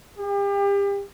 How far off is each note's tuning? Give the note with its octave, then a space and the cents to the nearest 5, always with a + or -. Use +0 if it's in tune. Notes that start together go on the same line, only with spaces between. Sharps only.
G4 +35